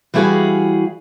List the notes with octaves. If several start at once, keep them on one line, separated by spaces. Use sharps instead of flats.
E3 G3 E4 F#4 G#4 F5